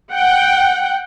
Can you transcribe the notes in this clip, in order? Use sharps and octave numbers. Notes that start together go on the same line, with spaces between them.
F#5 G5